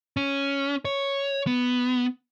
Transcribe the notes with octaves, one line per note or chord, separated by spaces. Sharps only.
C#4
C#5
B3